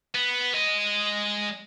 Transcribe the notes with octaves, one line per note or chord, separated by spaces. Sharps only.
B3
G#3 D#5